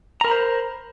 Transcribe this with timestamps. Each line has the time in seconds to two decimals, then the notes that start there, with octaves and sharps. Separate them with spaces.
0.21 A#5
0.24 A#4
0.28 B5
0.31 C5